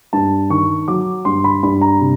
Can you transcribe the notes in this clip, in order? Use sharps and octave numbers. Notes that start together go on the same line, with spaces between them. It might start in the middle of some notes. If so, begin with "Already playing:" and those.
G2 A5
D#3 C#6
F#3 D6
G2 C6
B5
G2 B5
A#5
C3